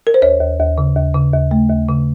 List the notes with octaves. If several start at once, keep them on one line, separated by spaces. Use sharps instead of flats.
A#4
C5
D#2 C#5
D#2
D#2
C#3
D#2
C#3
D#2
A3
D#2
C#3